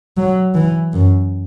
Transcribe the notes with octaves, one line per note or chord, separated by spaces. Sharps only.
F#3
E3
F#2